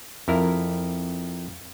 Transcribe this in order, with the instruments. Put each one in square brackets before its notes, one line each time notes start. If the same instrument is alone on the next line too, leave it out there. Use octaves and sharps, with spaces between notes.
[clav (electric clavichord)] F2 E4 A#4